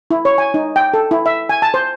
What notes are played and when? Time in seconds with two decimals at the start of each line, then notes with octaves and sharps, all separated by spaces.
0.11 E4
0.25 C#5
0.38 G#5
0.54 D#4
0.76 G5
0.94 A4
1.11 E4
1.26 E5
1.49 G#5
1.62 A5
1.74 C5